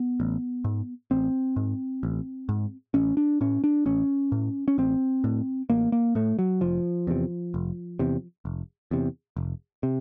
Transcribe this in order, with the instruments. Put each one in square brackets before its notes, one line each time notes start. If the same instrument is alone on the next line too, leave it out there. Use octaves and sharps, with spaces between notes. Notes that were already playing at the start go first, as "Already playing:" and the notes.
Already playing: [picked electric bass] B3
A1
G#2
A1 C4
G#2
A1
G#2
A1 C#4
D4
A2 C#4
D4
A1 C#4
A2
C#4
A1 C4
A2
A1 A#3
A#3
A2 A3
F#3
F1 F3
E2 C3
F1
E2 C3
F1
E2 C3
F1
C3